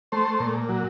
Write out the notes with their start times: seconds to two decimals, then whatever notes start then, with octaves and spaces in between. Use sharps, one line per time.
0.12 A3 C5
0.40 A#2
0.69 F#3